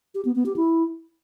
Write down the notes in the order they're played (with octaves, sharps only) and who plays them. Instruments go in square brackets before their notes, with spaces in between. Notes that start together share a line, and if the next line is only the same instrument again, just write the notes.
[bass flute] G4
B3
B3
G4
E4